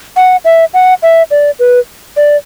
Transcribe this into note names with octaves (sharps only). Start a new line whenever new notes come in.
F#5
E5
F#5
E5
D5
B4
D5